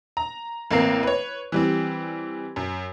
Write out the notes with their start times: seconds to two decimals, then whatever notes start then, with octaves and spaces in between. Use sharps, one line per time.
0.17 A#5
0.71 A1 A#3 C4 A#4 C7
1.03 B4 C#5
1.52 E3 G3 C4
2.56 F#2